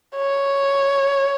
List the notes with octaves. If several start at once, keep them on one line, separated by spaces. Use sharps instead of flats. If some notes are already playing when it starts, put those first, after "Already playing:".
C#5